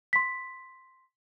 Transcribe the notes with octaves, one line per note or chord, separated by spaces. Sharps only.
C6 B6